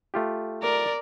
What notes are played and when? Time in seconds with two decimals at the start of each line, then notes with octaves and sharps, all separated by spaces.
0.14 A3 F4 G4
0.62 A#4 D5